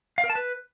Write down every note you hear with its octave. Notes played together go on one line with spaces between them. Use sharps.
F5
A#4
A5
B4